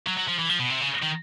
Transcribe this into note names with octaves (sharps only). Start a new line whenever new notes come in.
F#3
F#3
F3
E3
F3
B2
C3
C#3
D#3